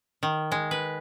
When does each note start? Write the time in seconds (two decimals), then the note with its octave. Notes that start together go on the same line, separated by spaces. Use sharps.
0.23 D#3
0.52 G#3
0.71 B4